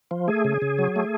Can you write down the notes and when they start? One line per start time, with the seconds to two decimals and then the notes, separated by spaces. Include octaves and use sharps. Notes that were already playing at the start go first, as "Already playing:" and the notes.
0.11 F3
0.28 A3 G#4
0.45 C#3
0.62 C#3
0.79 F#3
0.96 A3